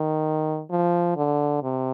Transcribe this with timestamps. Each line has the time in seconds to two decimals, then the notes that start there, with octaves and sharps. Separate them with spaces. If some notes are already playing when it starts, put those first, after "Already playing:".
Already playing: D#3
0.71 F3
1.16 D3
1.63 C3